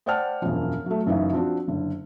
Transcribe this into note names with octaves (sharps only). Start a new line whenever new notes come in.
C5 D5 F#5 G5 A5 F6
E1 F#2 F3
F#3 A3
F#1 F#2 E3 D#4 F5
F3 C4 D4 F#4
F#1 D3